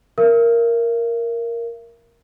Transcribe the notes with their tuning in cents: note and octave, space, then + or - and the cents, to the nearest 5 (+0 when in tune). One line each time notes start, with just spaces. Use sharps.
A#4 +0 E5 +40